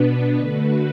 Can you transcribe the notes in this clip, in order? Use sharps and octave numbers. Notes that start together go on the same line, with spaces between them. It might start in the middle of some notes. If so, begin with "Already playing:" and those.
Already playing: B2 B3 D4 B4
D3 A3 F#4 B4